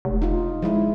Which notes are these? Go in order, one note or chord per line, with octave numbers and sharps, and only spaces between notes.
F1
D#4 F4
F3 G#3 E4